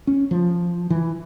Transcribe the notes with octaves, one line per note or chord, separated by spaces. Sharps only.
C#4
F3
E3